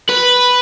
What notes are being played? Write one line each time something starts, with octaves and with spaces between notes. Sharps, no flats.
B4